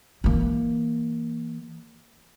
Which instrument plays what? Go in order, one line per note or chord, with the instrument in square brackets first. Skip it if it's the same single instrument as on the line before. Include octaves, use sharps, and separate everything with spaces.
[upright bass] E3 A#3